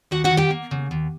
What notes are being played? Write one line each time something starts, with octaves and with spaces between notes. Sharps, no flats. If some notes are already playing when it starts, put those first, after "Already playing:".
D#2 F#4 F#5
F#4 F#5
D#3
G4 G5
A#3
C#3
D#2